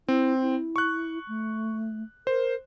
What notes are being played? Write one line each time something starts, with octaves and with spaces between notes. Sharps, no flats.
C4 E4
E4
C#6 F#6
A3
A#4 C5